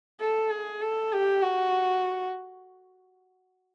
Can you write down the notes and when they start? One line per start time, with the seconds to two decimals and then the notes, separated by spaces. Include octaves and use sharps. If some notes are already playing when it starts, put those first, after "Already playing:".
0.21 A4
0.51 G#4
0.82 A4
1.12 G4
1.43 F#4